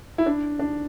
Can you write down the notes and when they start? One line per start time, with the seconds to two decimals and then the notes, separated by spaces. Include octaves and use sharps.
0.18 E4
0.26 D4
0.59 D4